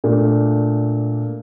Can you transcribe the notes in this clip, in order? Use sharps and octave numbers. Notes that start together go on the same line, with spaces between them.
A#2 A3 D4